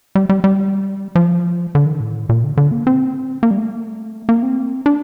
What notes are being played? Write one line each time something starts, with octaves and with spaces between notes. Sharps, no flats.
G3
G3
G3
F3
D3
D#3
A2
A#2
D3
D3
A#3
C4
A#3
G3
A3
A#3
C4
D4